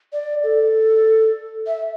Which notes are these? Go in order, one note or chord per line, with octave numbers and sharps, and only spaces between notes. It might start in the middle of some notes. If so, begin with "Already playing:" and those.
D5
A4
E5